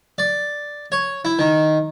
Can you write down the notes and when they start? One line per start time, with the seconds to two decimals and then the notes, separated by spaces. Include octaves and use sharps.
0.18 D5
0.92 C#5
1.25 E4
1.39 D#3